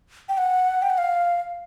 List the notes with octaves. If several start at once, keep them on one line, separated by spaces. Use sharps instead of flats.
G5
F#5
G5
F#5
F5